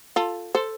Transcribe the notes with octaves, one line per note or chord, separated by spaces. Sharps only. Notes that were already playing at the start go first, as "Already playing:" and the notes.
F4 A4
A4 C5